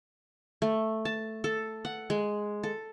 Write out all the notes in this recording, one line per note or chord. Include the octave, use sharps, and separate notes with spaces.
A3
A5
A4
F#5
G#3
A4